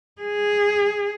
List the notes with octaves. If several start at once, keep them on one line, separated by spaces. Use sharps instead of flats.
G#4